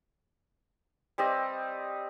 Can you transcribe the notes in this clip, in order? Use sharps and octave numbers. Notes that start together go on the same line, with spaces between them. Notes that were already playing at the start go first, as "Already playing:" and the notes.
G3 C4 G4 D#5